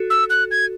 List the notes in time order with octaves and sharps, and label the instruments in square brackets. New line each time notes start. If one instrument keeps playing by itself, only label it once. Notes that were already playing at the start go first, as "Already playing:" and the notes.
Already playing: [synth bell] F#4 A4
[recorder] E6
F#6
G#6